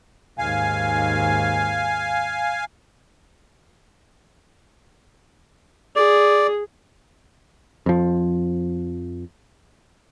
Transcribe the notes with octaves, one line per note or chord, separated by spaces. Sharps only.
D#2 G#2 F5 G#5
G#4 D5
F2 F3